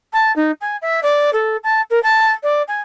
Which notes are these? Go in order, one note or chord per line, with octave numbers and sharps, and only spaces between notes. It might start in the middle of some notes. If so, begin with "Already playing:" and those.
A5
D#4
G#5
E5
D5
A4
A5
A#4
A5
D5
G#5